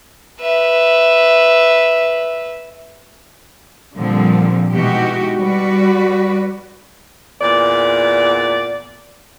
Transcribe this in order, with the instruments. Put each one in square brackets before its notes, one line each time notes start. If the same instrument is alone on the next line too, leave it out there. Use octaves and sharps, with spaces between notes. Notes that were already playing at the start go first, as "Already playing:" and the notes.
[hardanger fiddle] B4 E5
[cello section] A#2 D3 F3 G3 C4
B2 E3 G#3 D#4 F#4 G4
G3 F#4 B4 D5
[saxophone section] E2 A#2 D5